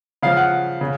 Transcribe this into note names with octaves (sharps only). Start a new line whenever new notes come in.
C#3 F3 F5
F#5
C#3